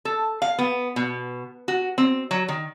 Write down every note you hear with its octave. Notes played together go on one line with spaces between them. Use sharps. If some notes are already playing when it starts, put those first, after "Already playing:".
A4
F5
B3
B2
F#4
C4
F#3
D#3